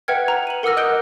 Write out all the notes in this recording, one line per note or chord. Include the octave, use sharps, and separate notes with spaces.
B4 E5 F#5 G5 F6 G#6
A#5
D#7 F#7
A#4 F#5 D6 E6 F6 A#6
D#5 D#6 F#6 G6 D7 G7